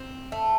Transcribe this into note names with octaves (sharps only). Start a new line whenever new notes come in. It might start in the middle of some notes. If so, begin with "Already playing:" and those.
Already playing: C4
A3